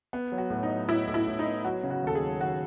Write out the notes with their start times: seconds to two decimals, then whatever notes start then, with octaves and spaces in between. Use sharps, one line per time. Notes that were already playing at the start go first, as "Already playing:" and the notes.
0.13 B3
0.32 F#3
0.38 F#4
0.50 A2
0.63 D#4
0.70 F#3
0.89 A2 E4
1.07 A2
1.14 E4
1.27 A2
1.39 D#4
1.46 B3
1.64 F#3 F#4
1.83 C#3
1.90 F#4
2.03 D#2 A4
2.15 G#4
2.21 F#3
2.41 D#2 F#4